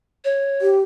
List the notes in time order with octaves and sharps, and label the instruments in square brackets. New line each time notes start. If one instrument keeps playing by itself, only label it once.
[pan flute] C#5
[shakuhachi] G4